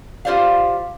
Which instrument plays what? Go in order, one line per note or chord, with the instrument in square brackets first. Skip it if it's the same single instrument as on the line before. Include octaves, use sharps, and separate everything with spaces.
[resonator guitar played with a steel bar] F4 G4 C5 D5 F5